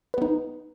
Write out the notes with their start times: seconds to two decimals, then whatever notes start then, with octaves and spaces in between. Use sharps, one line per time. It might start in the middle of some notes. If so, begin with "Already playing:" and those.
0.14 B4
0.18 B3
0.22 D#4